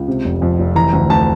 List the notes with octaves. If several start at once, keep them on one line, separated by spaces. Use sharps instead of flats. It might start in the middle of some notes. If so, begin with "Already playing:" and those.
Already playing: C#2
C3
F1
F2
F1
E3 A#5
D2
D2 A5